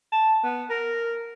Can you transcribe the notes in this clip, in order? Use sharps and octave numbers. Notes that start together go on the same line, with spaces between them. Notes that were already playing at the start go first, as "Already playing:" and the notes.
A5
B3
A#4